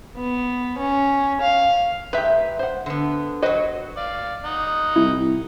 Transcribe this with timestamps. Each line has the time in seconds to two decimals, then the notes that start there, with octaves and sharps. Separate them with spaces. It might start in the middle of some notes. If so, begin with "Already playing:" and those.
0.16 B3
0.78 C#4
1.40 F5
2.13 G#2 G4 B4 E5
2.59 C5 F#5
2.86 D3 B3
3.42 F#3 F#4 B4 C5 D#5
3.97 D5 F5
4.45 D#4 F#5
4.96 C2 E4